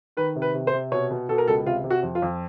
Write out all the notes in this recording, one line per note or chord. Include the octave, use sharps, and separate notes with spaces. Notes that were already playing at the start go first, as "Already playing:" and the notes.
D#3 B4
C3
B4
C3
C5
C3
B2 C#5
B2
B2 A4
A#4
C#2 A4
C3 F4
C3
F#4
F2
F4
F2